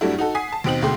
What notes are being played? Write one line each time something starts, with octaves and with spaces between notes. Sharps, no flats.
G2 F#3 G3 A3 D4 E4
D#4 F#4 A4
F#5 G#5 D#6 B6 C7
A5
D#2 B2 C4 D#4 F#7
D2 B2 G#3 A3 G5 C6